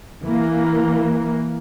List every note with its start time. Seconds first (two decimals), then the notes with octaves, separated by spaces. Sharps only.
0.24 E3 A#3